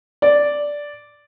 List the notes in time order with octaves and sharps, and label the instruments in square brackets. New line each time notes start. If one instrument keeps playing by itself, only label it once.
[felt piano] D5